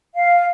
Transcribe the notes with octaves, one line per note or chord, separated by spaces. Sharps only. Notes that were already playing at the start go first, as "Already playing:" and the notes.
F5